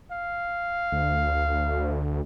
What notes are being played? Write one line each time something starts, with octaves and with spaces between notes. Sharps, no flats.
F5
D2